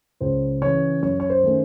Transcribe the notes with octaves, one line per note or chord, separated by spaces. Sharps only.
C#2 C5
C#3 E3 C#5
F#2 C#5
C#5
C5
D#3 A3 C#4